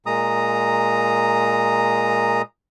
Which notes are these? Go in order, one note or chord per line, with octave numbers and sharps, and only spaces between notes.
A#2 G#3 A#5 D#6